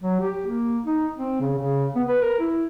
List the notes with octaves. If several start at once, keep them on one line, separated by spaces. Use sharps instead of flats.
F#3
G4
A#3
D#4
C4
C#3
C#3
B3
B4
A#4
E4